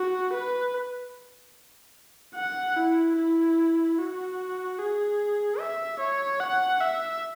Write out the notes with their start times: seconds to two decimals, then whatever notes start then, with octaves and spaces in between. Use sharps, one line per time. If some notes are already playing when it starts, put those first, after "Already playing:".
Already playing: F#4
0.33 B4
2.36 F#5
2.76 E4
3.17 E4
3.98 F#4
4.79 G#4
5.60 E5
6.00 C#5
6.40 F#5
6.81 E5